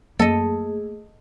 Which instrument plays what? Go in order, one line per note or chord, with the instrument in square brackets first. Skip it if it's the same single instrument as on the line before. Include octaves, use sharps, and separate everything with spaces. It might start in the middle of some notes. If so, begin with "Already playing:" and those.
[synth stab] F#2 [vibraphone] A3 G#4 [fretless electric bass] A#3 [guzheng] A4 D#5